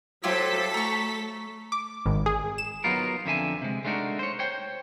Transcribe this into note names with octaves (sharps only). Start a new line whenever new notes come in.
F#3 E4 F4 G4 A4 C5 B6
A3 A#5 C#6
D6
G#1
G#4
E7
F#3 B3 D#4 F4 A#4
F2 D3 E5 G#5
C3 G#3
G#3 A3 D4 D#4 F#4 A#4
C5 C#5
C5 C#5 G5